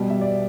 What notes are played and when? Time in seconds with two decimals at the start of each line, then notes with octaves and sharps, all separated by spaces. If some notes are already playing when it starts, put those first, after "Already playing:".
Already playing: B2 G3
0.10 E5
0.21 D5